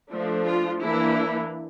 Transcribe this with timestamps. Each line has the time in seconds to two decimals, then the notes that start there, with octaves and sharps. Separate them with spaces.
0.11 F3 A3 D4
0.46 F4
0.81 E3 A#3 D4 E4